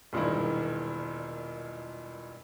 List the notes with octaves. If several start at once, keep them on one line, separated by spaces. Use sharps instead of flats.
E1 G2 A#2 D#3 D#4 E4